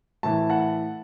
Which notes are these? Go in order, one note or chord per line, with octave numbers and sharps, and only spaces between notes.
A2 E3 A5
F#5 A5